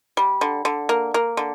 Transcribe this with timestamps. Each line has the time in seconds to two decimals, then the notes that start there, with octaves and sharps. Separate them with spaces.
0.17 G3
0.41 D3
0.65 D3
0.89 A#3
1.14 A#3
1.37 D3